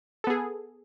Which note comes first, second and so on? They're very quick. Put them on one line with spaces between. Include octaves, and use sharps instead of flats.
A4 B3 G#4